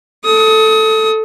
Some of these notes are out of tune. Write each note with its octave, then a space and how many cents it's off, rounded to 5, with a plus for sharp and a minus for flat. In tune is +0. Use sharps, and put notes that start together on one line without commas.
A4 +0 D#6 +30